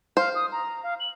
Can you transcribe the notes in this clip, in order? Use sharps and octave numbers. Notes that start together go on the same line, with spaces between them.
C5 F5
D#6
A#5
F5
F#7